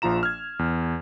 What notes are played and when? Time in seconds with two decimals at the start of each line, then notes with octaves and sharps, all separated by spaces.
0.02 A#1 F3 F4 A#5 E7
0.23 F6 G#6
0.59 E2